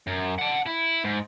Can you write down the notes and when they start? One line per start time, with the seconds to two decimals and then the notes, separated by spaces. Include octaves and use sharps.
0.07 F#2
0.39 F#5 A5
0.66 E4
1.05 G#2